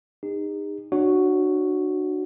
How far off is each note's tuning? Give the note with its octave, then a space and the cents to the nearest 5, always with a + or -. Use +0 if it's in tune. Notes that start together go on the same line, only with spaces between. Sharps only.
D#4 -20 G#4 -45
D4 +30 F#4 +0 C#5 +0